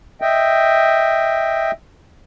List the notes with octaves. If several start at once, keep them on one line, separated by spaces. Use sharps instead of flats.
D#5 E5 G5